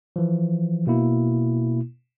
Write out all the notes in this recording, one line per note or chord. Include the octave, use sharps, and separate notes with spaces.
E3 F3
B2 A#3 E4